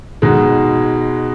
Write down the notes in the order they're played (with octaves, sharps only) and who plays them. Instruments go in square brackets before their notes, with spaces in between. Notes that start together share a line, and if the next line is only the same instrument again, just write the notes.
[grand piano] B2 G#3 D#4